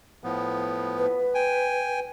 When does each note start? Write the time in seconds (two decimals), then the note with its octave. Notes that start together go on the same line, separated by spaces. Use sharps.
0.24 A2 F3 B3
0.98 B4
1.35 G5 G#5